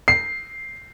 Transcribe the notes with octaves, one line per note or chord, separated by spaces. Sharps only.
C7